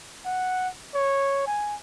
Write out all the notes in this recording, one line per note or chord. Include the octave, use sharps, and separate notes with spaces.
F#5
C#5
G#5